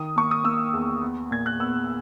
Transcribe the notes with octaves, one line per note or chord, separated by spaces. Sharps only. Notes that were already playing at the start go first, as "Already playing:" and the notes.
Already playing: D#3 D#6
A#3 C#6
D#6
A#3 E6
E2
B3
A#2 G#6
F#6
B3 E6